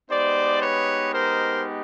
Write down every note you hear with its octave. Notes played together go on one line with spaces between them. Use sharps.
G#3 B3 D#4 G4 C5 D5
B4 C#5
A#4 C5